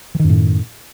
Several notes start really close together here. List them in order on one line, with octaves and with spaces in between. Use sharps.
E3 D#3 F#2 A2